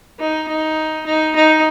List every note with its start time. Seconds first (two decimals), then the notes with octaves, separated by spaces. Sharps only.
0.19 D#4
0.48 D#4
1.06 D#4
1.36 D#4